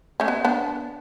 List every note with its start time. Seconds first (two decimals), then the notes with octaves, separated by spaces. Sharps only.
0.20 A3 C#4
0.28 B3
0.45 B3 D4